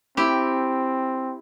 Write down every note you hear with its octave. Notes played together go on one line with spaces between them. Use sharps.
C4 E4 G4